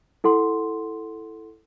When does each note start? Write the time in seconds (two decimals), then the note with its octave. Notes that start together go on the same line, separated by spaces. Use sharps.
0.24 E4 A4 F#5 C6